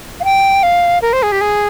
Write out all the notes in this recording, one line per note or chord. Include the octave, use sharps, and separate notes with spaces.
F5
G5
F5
A#4
C5
G#4
G4
G#4